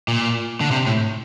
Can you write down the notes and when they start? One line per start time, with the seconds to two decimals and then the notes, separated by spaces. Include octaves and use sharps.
0.08 A#2
0.61 D3
0.71 C3
0.87 A2